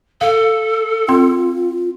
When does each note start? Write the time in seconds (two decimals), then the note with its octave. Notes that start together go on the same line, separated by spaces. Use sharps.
0.21 A4 F5
1.08 C4 F4 C6